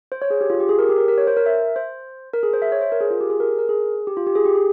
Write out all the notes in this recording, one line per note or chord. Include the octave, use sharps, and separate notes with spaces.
C5
C#5
G#4
G4
F4
G4
G#4
A#4
G4
A#4
A#4
C#5
C5
A#4
E5
C5
A#4
G#4
C5
E5
C#5
C5
A#4
G#4
F4
G4
G#4
A#4
A#4
G#4
G4
F4
G4
G#4
G4
G#4